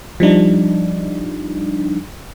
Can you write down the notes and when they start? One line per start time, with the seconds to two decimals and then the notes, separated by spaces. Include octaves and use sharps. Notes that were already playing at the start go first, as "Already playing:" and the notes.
0.20 F3 G3 D4 D#4